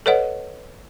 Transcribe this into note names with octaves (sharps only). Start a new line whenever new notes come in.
A4 B4 C#5 D#5 F#5